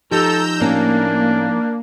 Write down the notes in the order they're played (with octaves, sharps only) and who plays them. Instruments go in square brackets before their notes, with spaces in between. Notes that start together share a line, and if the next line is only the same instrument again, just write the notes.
[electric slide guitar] F3 D#4 [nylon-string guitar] G4 [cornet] A4 [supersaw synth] A#5 E6 G6
[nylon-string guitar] A2 C#4 [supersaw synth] A#3 [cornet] D4